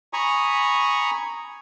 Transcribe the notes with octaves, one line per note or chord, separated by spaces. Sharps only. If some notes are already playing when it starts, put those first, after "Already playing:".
G#5 A#5 B5 C#6 D#6